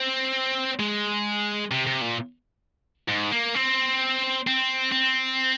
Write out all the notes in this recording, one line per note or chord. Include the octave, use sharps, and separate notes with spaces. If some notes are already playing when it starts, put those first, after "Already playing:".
Already playing: C4
G#3
C3
C3
A#2
G#2
A#3
C4
C4
C4